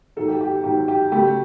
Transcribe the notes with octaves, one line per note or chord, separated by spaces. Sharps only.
G#2 D#3 F#3 A4
G4
G4
G#2 D#3 F#3 G4
G4
C#3 F#3 A3 G4